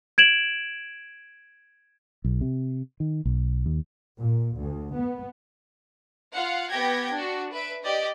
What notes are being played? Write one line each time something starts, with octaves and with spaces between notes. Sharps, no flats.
G#6 D7 E7 F#7
B1
C3
D#3
B1
D#2
A#2
D2
B3
F4 F5 F#5
B3 G4 G5 G#6 A#6
D4 F#4
B4 E5 D7
G4 D5 D#5